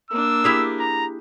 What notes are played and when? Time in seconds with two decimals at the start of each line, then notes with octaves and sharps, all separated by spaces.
0.10 A#3 D4 E6
0.44 E4 G4 G#4
0.79 A#5